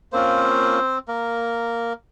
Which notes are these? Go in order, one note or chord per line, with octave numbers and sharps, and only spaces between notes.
A#3 C4 C#4 F4 C5
A#3 A#4